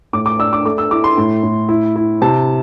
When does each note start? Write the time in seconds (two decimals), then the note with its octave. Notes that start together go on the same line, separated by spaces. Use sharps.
0.13 A2 D6
0.26 D6
0.39 D4 E6
0.53 D6
0.65 A3 D6
0.78 E6
0.91 E4 D6
1.04 C6
1.17 A2
1.43 A2
1.69 E4
1.96 E4
2.22 C3 A5